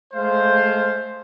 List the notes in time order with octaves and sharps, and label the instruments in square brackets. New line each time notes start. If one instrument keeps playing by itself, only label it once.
[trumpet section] G#3 A3 C5 F5